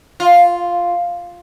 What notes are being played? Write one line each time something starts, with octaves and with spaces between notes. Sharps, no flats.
F4